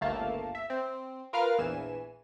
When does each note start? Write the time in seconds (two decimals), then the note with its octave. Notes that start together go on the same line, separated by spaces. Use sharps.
0.01 G1 C#2 A3 A#3 F5 A5
0.55 E5
0.70 C4
1.33 F4 A#4 B4 F5 F6
1.58 A#1 E2 E3 G#5 E7